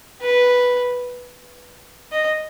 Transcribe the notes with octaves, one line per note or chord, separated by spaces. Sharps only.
B4
D#5